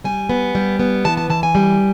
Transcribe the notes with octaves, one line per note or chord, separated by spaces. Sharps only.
G3 G#5
B3
G3
B3
E3 A5
A5
E3 A5
G#5
G3